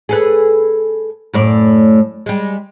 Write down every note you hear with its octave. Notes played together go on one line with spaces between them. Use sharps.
G#4 A4 B4
F#2 A2 D5
G3 G#3